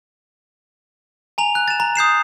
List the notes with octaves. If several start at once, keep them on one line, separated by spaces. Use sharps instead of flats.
G#5 A#5 F7
F#6
A6 E7
A#5
D#6 G6 C7 E7